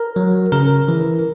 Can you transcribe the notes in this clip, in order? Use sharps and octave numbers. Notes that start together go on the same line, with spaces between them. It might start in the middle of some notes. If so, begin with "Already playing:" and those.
Already playing: A#4
F#3
C#3 A#4
E3